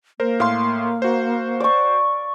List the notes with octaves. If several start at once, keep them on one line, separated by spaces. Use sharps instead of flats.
A#3 A#4 C5
A2 F5 C6
F#4 C5
D5 C#6